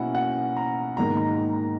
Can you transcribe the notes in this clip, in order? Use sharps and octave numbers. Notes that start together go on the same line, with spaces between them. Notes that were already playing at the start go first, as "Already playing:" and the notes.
Already playing: B2 A#3 C#4 E4 F#5
F#5
A#5
G#2 D#3 A#3 A#5
A#5
A#5
A#5